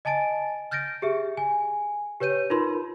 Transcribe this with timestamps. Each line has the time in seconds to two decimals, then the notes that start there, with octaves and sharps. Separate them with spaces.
0.05 D#5 G#5 A5 A6 D7
0.71 F6 G6 A6 A#6 D7
1.02 G4 G#4 E5
1.37 G#5
2.20 G4 B4 C#5 G6 D#7
2.50 D#4 F4 A#4 B4 B5 C6